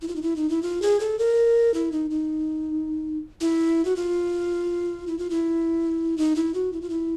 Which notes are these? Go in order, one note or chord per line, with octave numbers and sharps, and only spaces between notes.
E4
F4
D#4
E4
D#4
E4
F4
G#4
A4
A#4
E4
D#4
D#4
E4
F#4
F4
E4
F4
E4
D#4
E4
F#4
E4
F4
E4